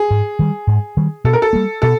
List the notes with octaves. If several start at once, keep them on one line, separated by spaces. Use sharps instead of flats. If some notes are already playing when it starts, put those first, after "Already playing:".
Already playing: G#4
G#2
D#3 G3
G#2
D#3 G3
B2 A4
A#4
A4
G3 A#3
B2 A4